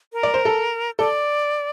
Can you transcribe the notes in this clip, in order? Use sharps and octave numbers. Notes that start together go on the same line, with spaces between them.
A#4
D5
C5
A4
A4 D5